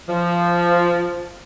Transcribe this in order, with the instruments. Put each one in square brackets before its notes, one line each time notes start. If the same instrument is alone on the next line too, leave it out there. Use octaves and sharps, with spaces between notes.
[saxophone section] F3